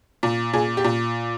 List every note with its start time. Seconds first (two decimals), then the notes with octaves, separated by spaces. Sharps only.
0.23 A#2
0.53 A#2 G#4
0.77 G4
0.84 A#2